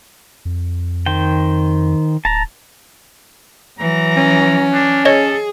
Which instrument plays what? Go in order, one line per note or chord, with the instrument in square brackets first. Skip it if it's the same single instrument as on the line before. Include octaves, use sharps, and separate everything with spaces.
[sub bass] F2
[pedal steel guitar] D#3 C5 G5
[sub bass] D1 [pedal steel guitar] A5 A#5
[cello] E3 F#3 [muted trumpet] A#5
[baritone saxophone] C#4
[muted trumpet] D4
[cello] G#4 [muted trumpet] A4 [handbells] C#5 D#5